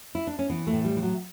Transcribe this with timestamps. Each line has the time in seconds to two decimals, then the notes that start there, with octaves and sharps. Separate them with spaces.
0.15 E4
0.27 D4
0.39 C#4
0.50 E3 B3
0.67 A3
0.73 A2
0.85 G3
0.96 E3
1.02 F#3